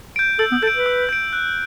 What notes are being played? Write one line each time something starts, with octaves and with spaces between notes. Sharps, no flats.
G6 D7
A4 E6
B3
A4 G6 D7
B4
E6
G6 D7
F#6